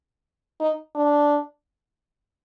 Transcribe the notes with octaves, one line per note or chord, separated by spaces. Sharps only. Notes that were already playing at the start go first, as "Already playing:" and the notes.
D#4
D4